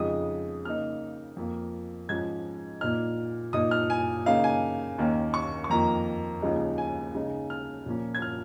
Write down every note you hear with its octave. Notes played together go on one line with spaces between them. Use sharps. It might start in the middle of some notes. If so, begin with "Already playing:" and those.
Already playing: F2 C#3 G#3 D#4 D#6
C#3 A#3 D#4 F6
F2 F3 A#3
G#2 F3 C#4 G#6
A#2 A#3 D#4 F6
A#2 A#3 D#4 D#6
F6
G#5
C#3 A#3 D#4 F5
G#5
D#2 D#3 A#3 C#4
C#6
C#6
F2 D#3 A#3 A#5
D#2 C#3 F3 G#3 D#4
G#5
C#3 G#3 D#4
F6
A#2 F3 A#3 C#4
G#6
F6